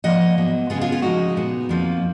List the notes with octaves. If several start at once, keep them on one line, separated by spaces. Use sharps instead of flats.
G#2 F3 A#3 D#5 F#5
G#2 F#3 B3
C#3 G#3 B3 F4 G#4
F4 G#4
C#4 F4
C#3 F3 G#3 C#4 D#4 F#4
A#2 G#3 B3
F2 F3 A#3